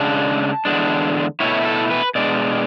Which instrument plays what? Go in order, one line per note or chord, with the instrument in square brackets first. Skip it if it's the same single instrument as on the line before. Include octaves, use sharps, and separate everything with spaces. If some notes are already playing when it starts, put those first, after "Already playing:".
Already playing: [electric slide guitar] C#3 G#3 D4 A5
E2 D3 G#3 D4
B2 A3 E4 C#5
A4
B4
B2 G#3 D4 D5